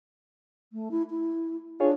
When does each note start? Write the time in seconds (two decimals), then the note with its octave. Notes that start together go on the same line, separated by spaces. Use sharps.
0.72 A3
0.91 E4
1.10 E4
1.80 D4 F4 G#4 C#5